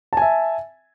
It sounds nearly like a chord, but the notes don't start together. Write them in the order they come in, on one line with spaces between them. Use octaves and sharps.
A5 G#5 E5